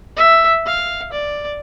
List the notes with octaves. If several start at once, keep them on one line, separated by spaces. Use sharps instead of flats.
E5
F5
D5